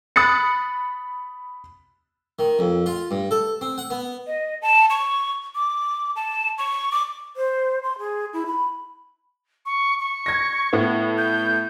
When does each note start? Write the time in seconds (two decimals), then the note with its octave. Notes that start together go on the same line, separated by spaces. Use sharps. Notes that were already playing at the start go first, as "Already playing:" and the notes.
0.16 B5 D#6 F#6 A6 C#7
2.39 D#3
2.59 F2
2.86 F4
3.11 G2
3.31 A4
3.61 C4
3.78 F#5
3.90 B3
4.27 D#5
4.62 A5
4.90 C#6
5.55 D6
6.16 A5
6.58 C#6
6.92 D6
7.37 C5
7.83 C6
7.99 G#4
8.33 E4
8.46 B5
9.66 C#6
10.00 C#6
10.26 G#6 A#6
10.73 A2 B3
11.18 G6